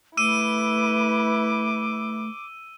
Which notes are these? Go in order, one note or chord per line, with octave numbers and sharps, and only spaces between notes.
A3 E4 B4 D6 E6 D#7